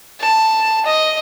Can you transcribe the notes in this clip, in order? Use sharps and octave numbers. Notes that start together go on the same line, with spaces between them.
A5
D#5